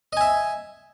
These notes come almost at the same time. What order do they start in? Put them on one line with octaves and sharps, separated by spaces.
D#5 G#5 E5